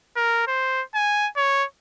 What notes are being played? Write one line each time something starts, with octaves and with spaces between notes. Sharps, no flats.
A#4
C5
G#5
C#5